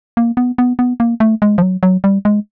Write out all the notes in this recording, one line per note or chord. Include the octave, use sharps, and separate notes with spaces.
A#3
B3
B3
B3
A#3
A3
G#3
F3
F#3
F#3
G3
G#3